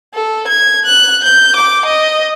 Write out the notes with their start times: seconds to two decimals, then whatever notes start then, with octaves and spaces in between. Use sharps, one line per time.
0.14 A4
0.48 G#6
0.86 F#6
1.24 G6
1.56 D6
1.86 D#5